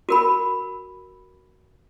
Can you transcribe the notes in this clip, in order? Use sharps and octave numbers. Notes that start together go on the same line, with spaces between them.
F#4 A#4 B5